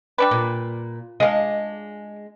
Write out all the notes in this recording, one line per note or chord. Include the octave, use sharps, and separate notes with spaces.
G3 D4 B4
A#2
G#3 D4 D#5 F5